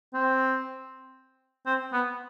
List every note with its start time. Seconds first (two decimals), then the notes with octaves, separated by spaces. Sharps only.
0.13 C4
1.66 C4
1.92 B3